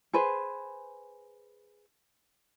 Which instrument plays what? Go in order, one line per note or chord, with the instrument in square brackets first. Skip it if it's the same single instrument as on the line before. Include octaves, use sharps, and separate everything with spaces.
[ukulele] G#4 B4 C5